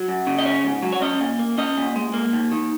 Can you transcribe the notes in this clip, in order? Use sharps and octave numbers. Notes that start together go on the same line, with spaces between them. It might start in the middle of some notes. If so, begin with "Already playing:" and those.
Already playing: F#3
F#2
C#3
D#5
C#4 C#5
G#2
F#3
C#5
C#4 D#5
A#2
A#3
C#4 D#5
A#2
G#3
A#3
D#2
D#3